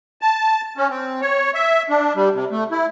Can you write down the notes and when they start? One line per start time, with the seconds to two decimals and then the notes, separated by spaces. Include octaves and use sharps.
0.22 A5
0.77 C#4
0.90 C4
1.22 C#5
1.54 E5
1.90 D4
2.16 G3
2.35 C3
2.51 A3
2.71 E4